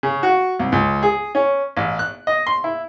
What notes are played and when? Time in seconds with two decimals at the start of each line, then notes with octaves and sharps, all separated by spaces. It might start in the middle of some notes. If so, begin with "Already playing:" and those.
0.03 C#3
0.23 F#4
0.60 C2
0.72 C#2
1.03 G#4
1.35 C#4
1.77 A1
1.99 F#6
2.27 D#5
2.47 C6
2.64 E4